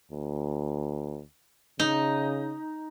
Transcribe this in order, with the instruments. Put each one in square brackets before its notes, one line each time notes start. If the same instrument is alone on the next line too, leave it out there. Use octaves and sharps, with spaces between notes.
[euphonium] D2
[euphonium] C#3 [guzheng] D#4